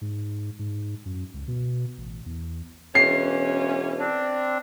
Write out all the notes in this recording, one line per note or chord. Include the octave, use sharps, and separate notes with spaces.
G#2
G#2
F#2
C#2
B2
A1
E2
E1 E2 E3 C#4 C7
C4 D4